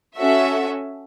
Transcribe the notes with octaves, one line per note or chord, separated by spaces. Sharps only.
C#4 F#4 A4 E5